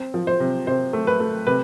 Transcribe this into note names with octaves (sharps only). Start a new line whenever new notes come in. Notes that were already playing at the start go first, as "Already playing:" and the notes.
Already playing: C4
F3
C5
C3
C3 C5
A3
B4
A3
C3 B4